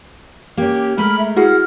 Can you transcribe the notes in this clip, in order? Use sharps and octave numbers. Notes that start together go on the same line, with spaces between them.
A#3 C#4 G4
G#3 A3 A#4 B5 F6
E5
E4 F#4 G#4 F#5 F6